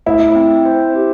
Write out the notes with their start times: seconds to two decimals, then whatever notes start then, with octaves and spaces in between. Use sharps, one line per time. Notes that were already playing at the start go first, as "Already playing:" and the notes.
0.06 A3 E4
0.35 C4
0.65 C5
0.95 G4